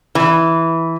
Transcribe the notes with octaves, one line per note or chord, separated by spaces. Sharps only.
E3